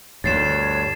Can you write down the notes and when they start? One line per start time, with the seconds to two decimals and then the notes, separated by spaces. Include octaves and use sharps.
0.24 D2 G2 C#5 A6 C7 E7